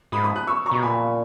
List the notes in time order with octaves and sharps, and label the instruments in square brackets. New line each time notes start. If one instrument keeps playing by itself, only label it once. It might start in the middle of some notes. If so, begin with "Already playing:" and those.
[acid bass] G#2 [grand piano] B5 D#6
[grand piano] B5 D#6
D#6 F#6
C#6 E6
A#5 C#6
[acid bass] B2
[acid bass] A#2 [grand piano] G#5 B5